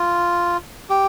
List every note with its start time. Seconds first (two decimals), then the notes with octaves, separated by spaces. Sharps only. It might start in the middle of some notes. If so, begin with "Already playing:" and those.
Already playing: F4
0.90 G4